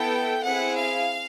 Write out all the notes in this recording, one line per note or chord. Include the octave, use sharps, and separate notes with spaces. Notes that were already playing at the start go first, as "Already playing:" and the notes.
Already playing: B3 E4 A4 G5
C4 E4 G#4 F#5
F5